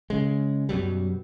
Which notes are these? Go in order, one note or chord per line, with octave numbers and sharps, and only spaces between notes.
C#3 G#3
F#2 B2 F#3 G3